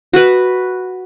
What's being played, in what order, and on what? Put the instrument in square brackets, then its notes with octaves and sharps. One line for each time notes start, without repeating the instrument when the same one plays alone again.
[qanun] F#4 B4